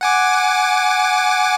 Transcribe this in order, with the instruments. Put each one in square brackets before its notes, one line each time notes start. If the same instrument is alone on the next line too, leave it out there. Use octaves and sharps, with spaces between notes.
[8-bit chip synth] F#5 G#5 D6